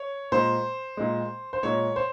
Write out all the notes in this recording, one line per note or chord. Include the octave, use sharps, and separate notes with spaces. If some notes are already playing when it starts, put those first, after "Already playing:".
Already playing: C#5
A#2 G#3 C5
A#2 G#3
C5
A#2 G#3 C#5
C5